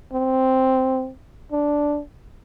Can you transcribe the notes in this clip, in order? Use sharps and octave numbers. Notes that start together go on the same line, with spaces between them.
C4
D4